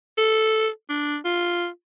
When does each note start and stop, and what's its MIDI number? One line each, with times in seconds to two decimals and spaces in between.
0.18 0.68 69
0.90 1.17 62
1.25 1.67 65